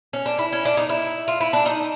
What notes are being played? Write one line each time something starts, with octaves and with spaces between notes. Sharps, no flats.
C#4
D4
E4
C#4
D4
D#4
E4
F4
E4
D4
D#4